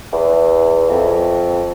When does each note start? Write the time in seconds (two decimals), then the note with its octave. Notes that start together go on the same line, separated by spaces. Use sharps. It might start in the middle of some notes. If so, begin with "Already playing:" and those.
0.13 E2
0.90 F2